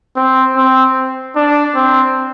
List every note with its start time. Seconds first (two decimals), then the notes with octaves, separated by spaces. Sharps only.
0.16 C4
0.56 C4
1.36 D4
1.75 C4